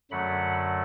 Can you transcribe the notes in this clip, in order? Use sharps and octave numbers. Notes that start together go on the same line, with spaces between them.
F#2 D3 F#3 A3 F#5 B5